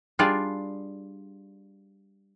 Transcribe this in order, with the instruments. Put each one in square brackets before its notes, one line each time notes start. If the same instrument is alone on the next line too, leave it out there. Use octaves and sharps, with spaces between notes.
[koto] G3 D4 F4 G#4 D5